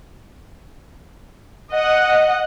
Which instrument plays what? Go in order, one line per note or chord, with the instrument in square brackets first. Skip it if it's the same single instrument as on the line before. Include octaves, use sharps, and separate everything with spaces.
[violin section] D#5 F#5